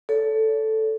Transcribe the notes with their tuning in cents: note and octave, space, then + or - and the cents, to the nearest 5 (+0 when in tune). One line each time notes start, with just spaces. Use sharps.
A4 +0 C#5 +40